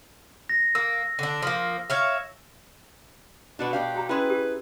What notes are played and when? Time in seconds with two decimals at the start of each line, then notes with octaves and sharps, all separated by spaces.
0.49 A#6
0.75 A#3 E6
1.19 D3 D4
1.42 F3 A#3
1.90 C#5 E5 F5
3.59 B2 D4 F#4 B4
3.73 B2 D4 G4 F5
3.95 F#4 G5 A#5
4.09 C#4 E4 G#4 B4 D5 C6
4.30 G4